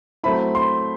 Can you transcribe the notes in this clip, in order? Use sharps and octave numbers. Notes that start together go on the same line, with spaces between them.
F#3 A3 C4 E4 B5
C6